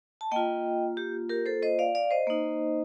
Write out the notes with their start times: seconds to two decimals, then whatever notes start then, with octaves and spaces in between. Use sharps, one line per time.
0.21 A5
0.31 A#3 F4 D#5 G5
0.97 G4
1.29 G4 A#4
1.46 A4 C5
1.63 C5 D#5
1.79 D5 F5
1.95 D5 F5
2.11 C5 D#5
2.27 A#3 D#4